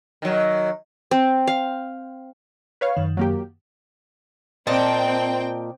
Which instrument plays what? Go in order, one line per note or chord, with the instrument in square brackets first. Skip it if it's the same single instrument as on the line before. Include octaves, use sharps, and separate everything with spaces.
[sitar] D#3 F#3
[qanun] C4
F5
[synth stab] B4 C#5 F5
[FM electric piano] F#2 D#3
[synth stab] F#3 A#3 G4
[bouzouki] A#2 D#5 A5 [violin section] C4 G5